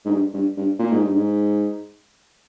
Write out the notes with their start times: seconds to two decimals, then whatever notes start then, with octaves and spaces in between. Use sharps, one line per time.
0.05 G#2
0.11 G2
0.34 G2
0.57 G2
0.79 A#2
0.92 G#2
1.03 G2
1.15 G#2